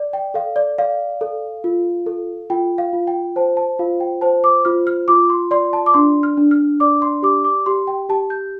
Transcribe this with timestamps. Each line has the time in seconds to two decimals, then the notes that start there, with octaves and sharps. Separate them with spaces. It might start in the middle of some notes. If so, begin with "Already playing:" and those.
Already playing: D5
0.13 G5
0.34 A4 F5
0.56 D5
0.78 D5 F5
1.21 A4
1.64 F4
2.06 A4
2.50 F4 G5
2.78 F5
2.93 F4
3.07 G5
3.36 C5 A5
3.57 A5
3.79 F4 F5
4.00 G5
4.21 C5 A5
4.44 D6
4.65 F4 F6
4.87 F6
5.08 F4 D6
5.30 C6
5.51 D5 C6
5.73 A5
5.86 D6
5.94 D4 C6
6.23 F6
6.37 D4
6.51 F6
6.80 D5 D6
7.02 C6
7.22 G4 D6
7.44 D6
7.66 G4 C6
7.87 G5
8.09 G4 A5
8.30 G6